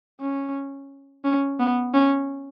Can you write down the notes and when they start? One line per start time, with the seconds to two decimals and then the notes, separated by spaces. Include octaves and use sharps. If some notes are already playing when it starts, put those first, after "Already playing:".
0.21 C#4
1.25 C#4
1.60 B3
1.94 C#4